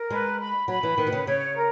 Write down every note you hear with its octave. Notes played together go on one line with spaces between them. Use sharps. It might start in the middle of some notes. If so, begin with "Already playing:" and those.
Already playing: A#4
G#3 B4
B5
F#3 B5
E3
D#3 B4
B2
C#3
C#3 C#5
A#4